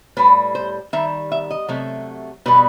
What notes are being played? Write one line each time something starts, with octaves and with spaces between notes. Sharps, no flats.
A2 G3 B4
C5
D#3 G3 E5
E5
D#5
C3 F#3 A3
B2 G3 B4